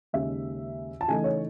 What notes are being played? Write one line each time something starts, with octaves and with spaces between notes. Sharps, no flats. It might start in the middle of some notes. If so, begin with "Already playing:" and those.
D#2 C#3 G#3 D#4 E5
A5
C#3 E3 A3 D#4 G#5
C#5